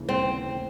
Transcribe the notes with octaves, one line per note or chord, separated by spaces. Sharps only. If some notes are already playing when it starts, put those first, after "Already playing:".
Already playing: D#2 C#3 E3
C4
A2